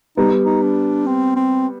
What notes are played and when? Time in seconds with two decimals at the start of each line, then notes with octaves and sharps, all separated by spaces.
0.17 G3 B3 D#4
0.44 D#4
0.62 D4
1.06 C4
1.36 C4